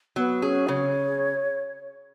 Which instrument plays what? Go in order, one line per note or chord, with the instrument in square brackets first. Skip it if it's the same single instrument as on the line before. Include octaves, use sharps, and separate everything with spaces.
[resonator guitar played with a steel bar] F#3 [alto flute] B3
[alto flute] C#4 [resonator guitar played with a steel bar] G#4
[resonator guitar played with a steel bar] C#3 [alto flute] C#5